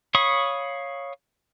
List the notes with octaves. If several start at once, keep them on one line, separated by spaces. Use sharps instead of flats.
C#5 F5 B5 C#6 D#6